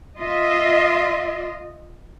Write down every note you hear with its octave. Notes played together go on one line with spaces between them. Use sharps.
F4 D#5 E5